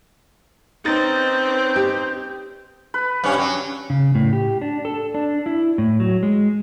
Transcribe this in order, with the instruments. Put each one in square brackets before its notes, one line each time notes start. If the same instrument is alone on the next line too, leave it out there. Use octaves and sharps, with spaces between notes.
[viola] C4 [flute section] C#4 B4 G6 [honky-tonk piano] D#4 A6
[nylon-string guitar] G4
[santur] B4
[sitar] G2 C#4 [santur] F#5
[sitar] F#3
[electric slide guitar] C#3
A2
G4
D4
A4
D4
E4
A2
F#3
G#3